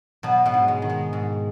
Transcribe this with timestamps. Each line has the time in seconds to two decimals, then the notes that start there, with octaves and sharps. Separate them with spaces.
0.23 B2 F#3 B3
0.46 B2 B3
0.54 G#2
0.68 G#3
0.82 D#3
0.89 G#3
1.13 G#2